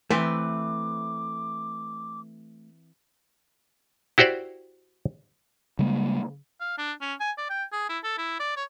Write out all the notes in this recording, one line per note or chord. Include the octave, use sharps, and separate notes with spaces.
E3 A3 C4 B4 D6
E4 F#4 G4 C5 D5
C#3 G3 G#3 A#3
F5
D4
C#4
G#5
D5
G5
G#4
E4
A4
E4
D5
C#5